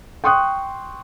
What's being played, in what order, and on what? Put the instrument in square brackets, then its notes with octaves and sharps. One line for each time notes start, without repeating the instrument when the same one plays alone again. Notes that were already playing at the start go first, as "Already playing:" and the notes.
[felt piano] G5 C6 C#6 D#6 F#6